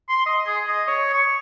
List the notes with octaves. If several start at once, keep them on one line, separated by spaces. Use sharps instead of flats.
C6
D#5
G#4
D#5
C#5
C#6